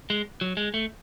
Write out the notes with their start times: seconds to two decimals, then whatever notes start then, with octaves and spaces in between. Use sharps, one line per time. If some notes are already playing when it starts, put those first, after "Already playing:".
0.10 G#3
0.41 F#3
0.57 G#3
0.74 A3